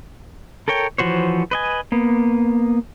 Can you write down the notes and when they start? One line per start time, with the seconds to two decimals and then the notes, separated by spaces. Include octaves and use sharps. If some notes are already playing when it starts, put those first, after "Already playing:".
0.68 A4 A#4 C#5 G5
0.98 E3 F3 F#4 C5 C#5
1.51 B4 D#5 G#5
1.92 A#3 B3